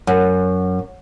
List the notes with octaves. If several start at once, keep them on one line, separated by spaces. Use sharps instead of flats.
F#2